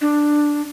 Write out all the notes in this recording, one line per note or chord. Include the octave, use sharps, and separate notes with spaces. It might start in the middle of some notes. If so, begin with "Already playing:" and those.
D4